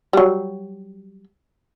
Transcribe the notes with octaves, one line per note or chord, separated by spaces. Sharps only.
F#3 G3